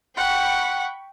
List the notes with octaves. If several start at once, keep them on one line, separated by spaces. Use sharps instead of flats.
F#5 G5 B5 C#6